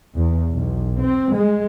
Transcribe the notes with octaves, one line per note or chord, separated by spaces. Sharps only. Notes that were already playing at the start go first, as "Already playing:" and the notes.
E2
B1
C4
G#3